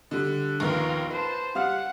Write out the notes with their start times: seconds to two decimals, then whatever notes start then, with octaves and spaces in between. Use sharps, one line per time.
0.11 D3 G3
0.60 A#1 D#2 B3 F4 A#4
1.10 B4 C5 A5
1.55 G3 F5 F#5 F6